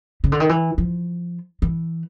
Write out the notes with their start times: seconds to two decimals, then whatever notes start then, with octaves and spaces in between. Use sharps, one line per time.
0.24 C#3
0.32 D3
0.40 D#3
0.49 E3
0.78 F3
1.62 E3